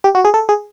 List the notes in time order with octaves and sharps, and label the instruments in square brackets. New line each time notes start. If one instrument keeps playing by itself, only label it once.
[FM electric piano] G4
F#4
G#4
A4
G#4